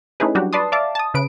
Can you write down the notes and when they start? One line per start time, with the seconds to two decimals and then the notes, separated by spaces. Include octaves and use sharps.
0.20 A3 C#4 D#4 E4 G#4 B4
0.35 F#3 G3 D4 F#4 G4
0.53 B4 D5 A5 C6 D#6
0.72 D5 E5 F5 A5 D6
0.95 A5 D#6
1.14 C#3 B4 D7